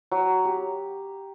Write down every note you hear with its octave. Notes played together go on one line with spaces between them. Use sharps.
F#3
G4